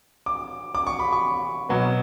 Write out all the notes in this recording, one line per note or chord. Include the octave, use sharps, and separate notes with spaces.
D6
D6
C#6
B5
C#6
B2 F#3 B3